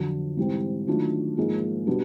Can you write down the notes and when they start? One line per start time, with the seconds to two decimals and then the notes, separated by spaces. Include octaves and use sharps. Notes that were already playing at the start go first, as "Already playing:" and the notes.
Already playing: F2 D3 F#3
0.37 G#2 E3 G3 C4
0.87 D#3 F#3 A3 D4 F4
1.37 G#2 F3 A#3 D#4 G#4
1.87 B2 G3 B3 D4